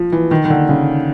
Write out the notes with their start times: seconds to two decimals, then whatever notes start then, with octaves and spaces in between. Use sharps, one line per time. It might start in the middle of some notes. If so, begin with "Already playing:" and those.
Already playing: F3
0.12 E3
0.31 D#3
0.45 D#3
0.50 D3
0.69 C#3